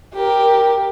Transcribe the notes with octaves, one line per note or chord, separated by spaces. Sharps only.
G4 A#4